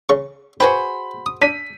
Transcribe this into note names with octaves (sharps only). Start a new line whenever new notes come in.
C#3 C#6
F#4 G#4 B4 C5 G5 B5
D#6
D4 B6 D#7